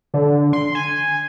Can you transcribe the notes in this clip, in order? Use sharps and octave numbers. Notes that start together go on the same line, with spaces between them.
D3
C6
G#5